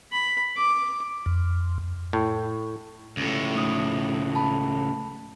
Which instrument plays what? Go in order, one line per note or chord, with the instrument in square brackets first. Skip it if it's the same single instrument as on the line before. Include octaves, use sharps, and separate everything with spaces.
[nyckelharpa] B5
D6
[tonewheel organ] F2
[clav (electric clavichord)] A2
[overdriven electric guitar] C#2 A2
[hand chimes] A3 D#4 D#6
A5 B5